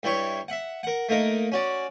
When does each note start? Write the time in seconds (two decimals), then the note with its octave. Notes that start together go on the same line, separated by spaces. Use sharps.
0.03 G2 G3 E4 C#5 C#6
0.48 E5 F#5
0.83 A#4 F#5
1.09 A3 A#3 D#4 A#4
1.52 C#4 F#4 D5